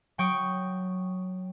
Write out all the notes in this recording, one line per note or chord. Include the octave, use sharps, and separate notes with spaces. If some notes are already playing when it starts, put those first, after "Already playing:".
F#3 G5 C#6 D#6 D7